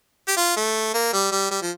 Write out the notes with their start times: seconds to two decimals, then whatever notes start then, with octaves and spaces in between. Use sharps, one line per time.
0.28 G4
0.37 F4
0.56 A3
0.94 A#3
1.13 G3
1.32 G3
1.51 G3
1.62 F3